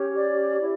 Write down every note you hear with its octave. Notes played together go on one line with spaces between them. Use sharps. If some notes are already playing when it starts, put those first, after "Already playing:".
Already playing: C#4 G4 C#5
D5
E4 G4 C#5